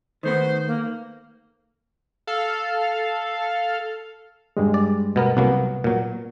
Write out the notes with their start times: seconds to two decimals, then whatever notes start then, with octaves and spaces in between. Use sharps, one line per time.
0.23 D#3 A3 B3 C5
0.67 A#3
2.27 A4 F5
4.57 G2 G3 G#3
4.74 D5
5.16 B2 B3 A#4
5.37 C2 F#3 A#3 B3
5.84 A#2 F#3